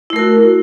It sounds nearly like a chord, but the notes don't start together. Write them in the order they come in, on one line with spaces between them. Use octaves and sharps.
E4 A3 A#4 F#4